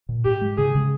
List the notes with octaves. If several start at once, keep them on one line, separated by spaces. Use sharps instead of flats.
A#2
G#2 G4
G#3
C#3 G#4
C#3